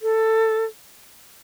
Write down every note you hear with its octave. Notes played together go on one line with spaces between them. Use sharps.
A4